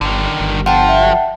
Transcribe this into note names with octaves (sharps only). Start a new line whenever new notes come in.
G1 D3 D#3
G1
F3 F#5 G5 A5
E5